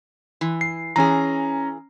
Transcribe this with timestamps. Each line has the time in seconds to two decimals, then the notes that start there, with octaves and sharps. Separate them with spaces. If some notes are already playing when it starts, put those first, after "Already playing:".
0.41 E3
0.61 C7
0.96 E3 C#4 G#4 A#5